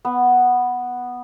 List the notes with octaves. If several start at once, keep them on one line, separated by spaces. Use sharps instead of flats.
B3